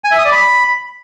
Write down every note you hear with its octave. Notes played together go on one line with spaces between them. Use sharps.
G#5
E5
D#6
D5
B5